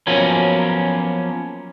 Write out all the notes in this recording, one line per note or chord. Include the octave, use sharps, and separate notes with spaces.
F3 F#3 A#3 B3 C#4